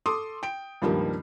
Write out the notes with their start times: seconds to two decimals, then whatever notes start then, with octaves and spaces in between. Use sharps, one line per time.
0.06 A4 C6 D6 D#6
0.43 G5 D7
0.82 C#2 G2 D#3 F3 G3 A#3